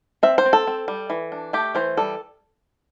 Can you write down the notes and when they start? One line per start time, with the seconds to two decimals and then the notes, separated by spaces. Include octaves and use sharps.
0.23 C4 E5
0.38 C5
0.45 C4
0.53 A4
0.67 C4
0.88 G3
1.10 E3
1.32 D4
1.53 A3 G4
1.75 E3 C5
1.97 G3 A4